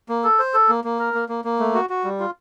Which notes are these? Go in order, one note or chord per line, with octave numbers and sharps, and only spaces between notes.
A#3
A4
C5
A4
A#3
A#3
A#4
A#3
A#3
A#3
A3
F#4
F#4
G3
F4